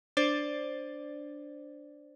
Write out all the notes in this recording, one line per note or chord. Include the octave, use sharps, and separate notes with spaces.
D4 C5 D5